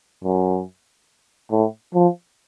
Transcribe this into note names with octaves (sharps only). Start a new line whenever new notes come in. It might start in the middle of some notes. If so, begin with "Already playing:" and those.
F#2
A2
F3